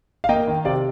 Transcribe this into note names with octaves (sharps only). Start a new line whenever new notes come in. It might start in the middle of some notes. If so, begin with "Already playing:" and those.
F5
A#3 D#5 G5
D#3
C3 D5 F5